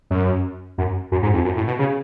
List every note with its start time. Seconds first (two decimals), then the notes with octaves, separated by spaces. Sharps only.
0.10 F#2
0.78 F#2
1.12 F#2
1.23 G#2
1.34 F2
1.45 F#2
1.57 A2
1.68 B2
1.79 C#3